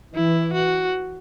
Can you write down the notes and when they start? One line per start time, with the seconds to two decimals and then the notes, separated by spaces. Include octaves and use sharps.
0.14 E3 E4
0.53 F#4